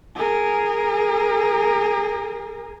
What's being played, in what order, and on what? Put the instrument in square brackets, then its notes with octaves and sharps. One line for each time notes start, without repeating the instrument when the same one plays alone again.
[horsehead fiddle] G#4 A#4